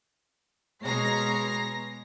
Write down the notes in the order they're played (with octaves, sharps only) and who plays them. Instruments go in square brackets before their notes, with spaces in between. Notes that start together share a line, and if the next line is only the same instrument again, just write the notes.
[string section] B2 G#3 C#5 A#5 A#6 C7